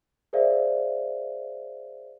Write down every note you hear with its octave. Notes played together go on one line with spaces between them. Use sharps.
G#4 A#4 C5 D5 E5 F5